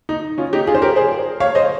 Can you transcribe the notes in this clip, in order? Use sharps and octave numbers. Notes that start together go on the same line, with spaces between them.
D#4
C#4 F4
D#4 G4
F4 G#4
C5
G4 A#4
G#4 C5
C#5 F5
C5 D#5